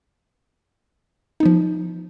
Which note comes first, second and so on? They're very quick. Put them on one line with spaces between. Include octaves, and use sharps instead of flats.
D#4 B3 F3